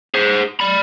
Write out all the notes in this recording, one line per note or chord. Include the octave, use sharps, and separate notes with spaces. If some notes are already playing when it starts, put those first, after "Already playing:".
G#4 C5
D5 B5